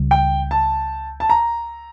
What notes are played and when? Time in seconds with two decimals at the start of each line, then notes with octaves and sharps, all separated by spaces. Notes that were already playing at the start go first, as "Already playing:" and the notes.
Already playing: C#2 C#3 G3
0.11 G5
0.51 A5
1.20 A5
1.30 A#5